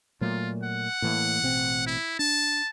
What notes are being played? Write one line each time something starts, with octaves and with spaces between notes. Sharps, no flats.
A#2 F#3 A3 F4
F#5
A2 E3 A#3
A1 B2 C4
E4
D4 A5